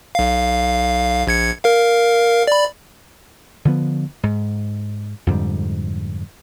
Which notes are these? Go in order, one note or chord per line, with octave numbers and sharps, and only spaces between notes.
B1 F5
A#1 G#6 C#7
A#4 F5
D5 B5
D3 F3 B3
G#2
F2 G#2 D3 G3